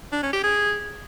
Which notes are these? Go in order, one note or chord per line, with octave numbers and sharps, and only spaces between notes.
D4
C#4
G4
G#4